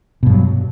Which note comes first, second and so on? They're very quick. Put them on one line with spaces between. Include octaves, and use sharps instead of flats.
B2 G2 F#3